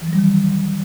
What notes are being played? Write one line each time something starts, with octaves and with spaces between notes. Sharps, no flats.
E3
F#3
G3
D#3